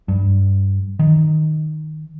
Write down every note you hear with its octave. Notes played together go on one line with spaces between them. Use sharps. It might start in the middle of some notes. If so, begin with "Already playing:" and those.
G2
D#3